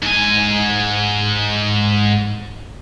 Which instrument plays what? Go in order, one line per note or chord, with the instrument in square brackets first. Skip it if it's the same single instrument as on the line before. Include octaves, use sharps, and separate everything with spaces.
[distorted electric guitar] G#2 G#5